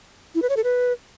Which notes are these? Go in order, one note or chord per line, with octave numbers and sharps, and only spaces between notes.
E4
B4
C#5
A4
B4